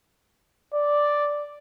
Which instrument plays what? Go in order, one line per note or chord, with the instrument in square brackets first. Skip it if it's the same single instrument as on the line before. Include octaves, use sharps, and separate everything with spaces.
[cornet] D5